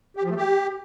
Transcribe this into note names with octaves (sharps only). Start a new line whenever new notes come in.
G4
F3
A3
G4